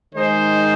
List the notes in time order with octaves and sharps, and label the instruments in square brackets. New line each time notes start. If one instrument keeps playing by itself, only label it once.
[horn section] D#3 G#3 D#4 C5